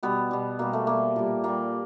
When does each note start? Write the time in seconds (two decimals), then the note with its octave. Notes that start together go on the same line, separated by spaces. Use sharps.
0.03 B2 G3 B3
0.31 B2 G3
0.59 B2 G3 A#3
0.73 A3
0.87 B2 G3 A#3
1.16 A#2 G3
1.44 A#2 G3 A#3